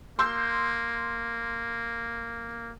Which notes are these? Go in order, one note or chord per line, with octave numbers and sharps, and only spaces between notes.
A#3 C6 E6 G6